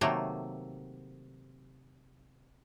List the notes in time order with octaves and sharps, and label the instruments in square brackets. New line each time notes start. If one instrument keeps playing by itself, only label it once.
[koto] C3 D#3 F#3 A3 A#3